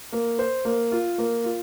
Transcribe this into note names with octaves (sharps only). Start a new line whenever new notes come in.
A#3
C5
A#3
F4
A#3
F4